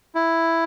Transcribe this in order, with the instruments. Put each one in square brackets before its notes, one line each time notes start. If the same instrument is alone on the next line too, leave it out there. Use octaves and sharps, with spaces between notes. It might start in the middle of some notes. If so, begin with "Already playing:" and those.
[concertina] E4